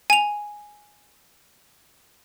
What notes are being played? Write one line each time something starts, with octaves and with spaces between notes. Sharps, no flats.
G#5 F7